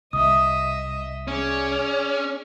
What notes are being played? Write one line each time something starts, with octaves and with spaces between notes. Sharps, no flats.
C2 D#5 E5 D#6
C#4 G#4 D5